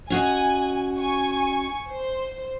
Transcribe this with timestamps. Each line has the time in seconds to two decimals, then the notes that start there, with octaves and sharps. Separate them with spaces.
0.10 C#4 F#4 D#5 G#5
0.97 G#5 C#6
1.89 C5